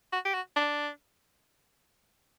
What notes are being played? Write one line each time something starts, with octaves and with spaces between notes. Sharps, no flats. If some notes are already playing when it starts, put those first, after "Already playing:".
F#4
G4
F#4
D4